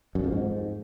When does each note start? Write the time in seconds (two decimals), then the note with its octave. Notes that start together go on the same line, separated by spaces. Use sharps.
0.15 F#2
0.24 F2
0.32 G#2